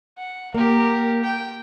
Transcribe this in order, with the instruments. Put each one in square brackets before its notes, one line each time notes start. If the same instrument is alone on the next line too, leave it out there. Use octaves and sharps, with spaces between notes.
[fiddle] F#5
[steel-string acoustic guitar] A#3 [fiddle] G4 A#4
[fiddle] G5